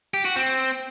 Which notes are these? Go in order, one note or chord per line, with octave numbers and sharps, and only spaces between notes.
G4
F#4
C4